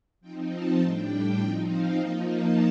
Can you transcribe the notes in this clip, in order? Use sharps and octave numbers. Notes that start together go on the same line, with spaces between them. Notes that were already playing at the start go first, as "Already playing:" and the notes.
F3 C4 D#4 G5
A5
A2 G3 D4 G5
F3 C4 D#4 G5
F5
F3 A#3 D#4 G5
A5